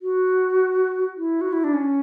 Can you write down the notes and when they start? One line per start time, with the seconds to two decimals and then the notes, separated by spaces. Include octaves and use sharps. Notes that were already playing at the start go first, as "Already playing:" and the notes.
0.02 F#4
1.17 E4
1.41 F#4
1.53 E4
1.64 D4
1.74 C#4